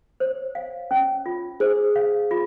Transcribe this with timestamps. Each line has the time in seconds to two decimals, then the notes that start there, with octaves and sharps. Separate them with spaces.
0.20 C5 C#5
0.55 F5
0.91 C#4
1.26 F4
1.60 G#4 C5
1.96 F5
2.31 F4